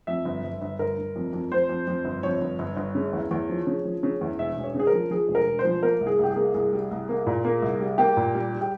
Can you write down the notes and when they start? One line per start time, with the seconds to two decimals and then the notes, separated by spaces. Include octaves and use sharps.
0.07 F2 E5
0.25 G1
0.44 G1
0.62 G1
0.79 G1 A#4
0.98 G1
1.16 F2
1.33 F2
1.52 F2 C5
1.69 F2
1.88 F2
2.05 G1
2.23 F2 C#5
2.41 G1
2.59 G1
2.77 G1
2.95 C#3
3.13 E2
3.31 E2
3.49 F3
3.67 C#3
3.85 F3
4.03 C#3
4.21 E2
4.39 E1 E5
4.57 E1
4.63 C#5
4.75 C#3 G#4
4.87 A#4
4.93 F3
5.11 F3 G#4
5.28 E1
5.35 A#4
5.46 E1
5.59 C5
5.65 F3
5.83 A#3 A#4
6.01 C2
6.07 G#4
6.19 C2 G4
6.31 G#4
6.36 A#3
6.54 C2 G#4
6.73 G3
6.91 C2
7.09 A#3
7.27 A#2
7.45 A#3
7.62 C2
7.80 G3
7.98 A#3 G4
8.17 A#2
8.34 G3
8.53 G3
8.61 G4